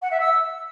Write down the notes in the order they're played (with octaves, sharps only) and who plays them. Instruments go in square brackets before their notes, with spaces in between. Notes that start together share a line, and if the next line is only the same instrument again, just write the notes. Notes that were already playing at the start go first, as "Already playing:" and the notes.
[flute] F#5
E5
E6